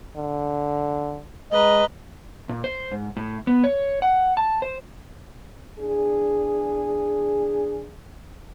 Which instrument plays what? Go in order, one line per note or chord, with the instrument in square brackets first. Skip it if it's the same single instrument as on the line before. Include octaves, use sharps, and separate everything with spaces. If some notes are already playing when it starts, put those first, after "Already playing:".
[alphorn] D3
[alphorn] G#3 [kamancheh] B4 A#5 [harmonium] D#5
[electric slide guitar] A#2
C5
G#2
A2
B3
C#5
F#5
A5
C5
[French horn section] E2 D4 G#4